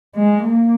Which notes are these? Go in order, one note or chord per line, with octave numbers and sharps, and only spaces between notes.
G#3
A#3